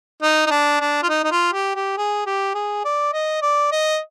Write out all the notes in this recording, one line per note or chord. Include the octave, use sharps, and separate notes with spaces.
D#4
D#4
D4
D4
F4
D#4
D#4
F4
G4
G4
G#4
G4
G#4
D5
D#5
D5
D#5